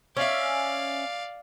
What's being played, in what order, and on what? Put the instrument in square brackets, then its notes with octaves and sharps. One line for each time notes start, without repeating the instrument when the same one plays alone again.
[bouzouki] C#4 E5 [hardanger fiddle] D5 F5